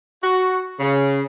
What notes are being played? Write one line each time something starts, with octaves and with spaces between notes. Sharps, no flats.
F#4
C#3